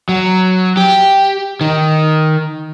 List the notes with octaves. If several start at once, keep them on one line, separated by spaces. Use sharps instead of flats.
F#3
G4
D#3